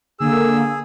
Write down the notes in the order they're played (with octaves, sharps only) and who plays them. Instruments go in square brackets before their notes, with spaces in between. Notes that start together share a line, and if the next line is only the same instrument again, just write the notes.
[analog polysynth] D3 A#3 [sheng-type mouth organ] G#4 [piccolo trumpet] E6